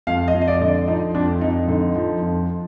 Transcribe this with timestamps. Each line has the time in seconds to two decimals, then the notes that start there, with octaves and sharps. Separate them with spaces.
0.07 F2 F5
0.28 D#5
0.34 F2
0.41 D#5
0.48 D5
0.61 D3 D#5
0.68 D5
0.88 F3 D#4
1.15 F2 D4
1.41 F2 D#4
1.68 D3 D#4
1.95 F3
2.22 F2